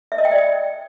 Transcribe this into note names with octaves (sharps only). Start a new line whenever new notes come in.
E5
D#5
G5
D5
G5